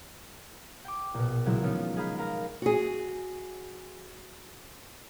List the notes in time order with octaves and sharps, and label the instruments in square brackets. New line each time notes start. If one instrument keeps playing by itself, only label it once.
[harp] G5 D6
A#1 B2
C#3 F3 F#3 G#3 E4
D#3 F3 B3 C#4 D#4 F4
G#4 D#5 F5 A#5 B5 G6
A#4 D#5 F5 A#5
[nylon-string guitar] F#4 G#4